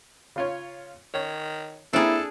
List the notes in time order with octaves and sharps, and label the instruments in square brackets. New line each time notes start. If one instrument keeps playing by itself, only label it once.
[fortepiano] C#3 F4 C#5
[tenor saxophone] D#3 [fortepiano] C#5
[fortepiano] A#3 C4 [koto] D4 G#4 [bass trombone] E4 [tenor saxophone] A4